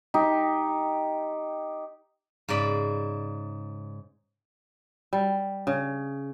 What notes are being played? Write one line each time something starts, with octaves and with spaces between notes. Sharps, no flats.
D#4 G4
G#2 C#3 D5 B5
G3
C#3